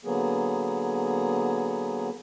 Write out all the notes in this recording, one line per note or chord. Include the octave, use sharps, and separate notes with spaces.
D3 F#3 A#3 B3 G#4